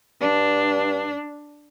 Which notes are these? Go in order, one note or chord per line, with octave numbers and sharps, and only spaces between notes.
G2 D4